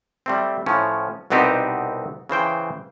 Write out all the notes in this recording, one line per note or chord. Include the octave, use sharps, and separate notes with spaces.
G3 A3 C4
A2 F3 C#4
C2 B2 B3 C4 D#4 G4
C#3 E3 C5 G5